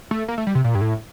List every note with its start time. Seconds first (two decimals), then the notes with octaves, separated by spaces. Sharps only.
0.11 A3
0.28 A#3
0.38 A3
0.47 G3
0.55 C3
0.64 A#2
0.75 G2
0.81 A2